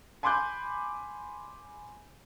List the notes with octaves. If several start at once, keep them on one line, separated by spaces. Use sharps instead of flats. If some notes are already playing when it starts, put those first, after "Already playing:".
G#5 B5 C6 D6 F#6 G6